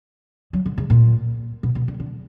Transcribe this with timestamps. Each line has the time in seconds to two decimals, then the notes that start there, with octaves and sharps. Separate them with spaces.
0.53 F#3
0.66 D3
0.78 C#3
0.90 A#2
1.63 B2
1.75 B2
1.88 D3
2.00 D3